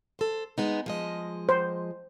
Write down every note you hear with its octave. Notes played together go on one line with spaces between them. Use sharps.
A4 C5
G#3 B3 D#4
F3 G#3 D#5
C5